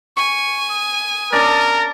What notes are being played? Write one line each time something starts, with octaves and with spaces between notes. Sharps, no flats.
G#5 C#6
D#6
C#4 D4 A#4 D5